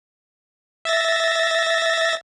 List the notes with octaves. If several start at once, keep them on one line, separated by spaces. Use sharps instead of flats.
E5 A6 A#6